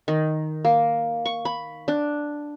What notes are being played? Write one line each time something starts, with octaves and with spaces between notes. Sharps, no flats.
D#3
A#3
C#6
B5
D4